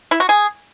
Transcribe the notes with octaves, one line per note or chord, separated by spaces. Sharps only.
E4
F#4
G#4